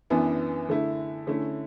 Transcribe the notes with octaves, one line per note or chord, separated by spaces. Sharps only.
F#2 E3 B3 D4
D3 A3 E4
D3 A3 C#4 E4